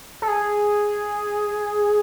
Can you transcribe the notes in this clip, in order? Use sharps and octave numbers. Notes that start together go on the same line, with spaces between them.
A4
G#4